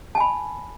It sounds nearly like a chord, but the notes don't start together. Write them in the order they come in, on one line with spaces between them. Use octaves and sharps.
A5 G#5 B5